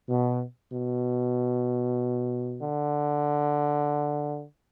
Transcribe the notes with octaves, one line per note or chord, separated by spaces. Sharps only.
B2
B2
D3